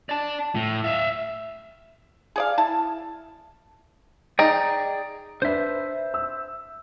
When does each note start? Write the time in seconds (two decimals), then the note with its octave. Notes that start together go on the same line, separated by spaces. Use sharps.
0.09 D5 A5
0.55 A2
0.84 E5 F5
2.36 G#4 D5 F5
2.58 E4 A5
4.39 D#4 G#4 D5 G5
5.42 D4 B4 C5 E5
6.14 E6